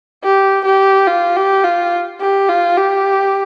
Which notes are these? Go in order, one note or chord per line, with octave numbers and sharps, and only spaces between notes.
G4
G4
F4
G4
F4
G4
F4
G4